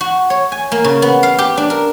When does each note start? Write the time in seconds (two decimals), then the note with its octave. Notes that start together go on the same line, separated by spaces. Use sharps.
0.01 F#4
0.30 C#5
0.52 G#5
0.72 A#3
0.84 C#3
1.02 B3
1.23 F5
1.38 G4
1.57 D4
1.70 A#4